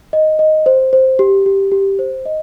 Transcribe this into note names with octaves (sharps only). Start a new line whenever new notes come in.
D#5
D#5
C5
C5
G4
G4
G4
C5
D#5